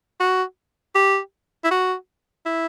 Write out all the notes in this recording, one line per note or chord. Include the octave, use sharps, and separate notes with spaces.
F#4
G4
E4
F#4
E4